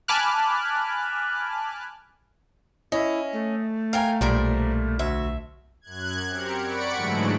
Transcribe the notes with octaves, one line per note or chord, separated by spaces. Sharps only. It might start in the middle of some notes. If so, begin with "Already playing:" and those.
G#5 A5 B5 D6 F6 F#6
C#4 E4 D#5 E5
A3
A#4 F5 G5 G#5 A#5
B1 A#2 G3 A#4 C5 D5
D2 F#4 E5
F#2 F#6 G#6
C4 G4 A#4 C#7
D5 F#5 B5 C#6 C#7 D7
G#2 D3 E3 F#3 G#3 A3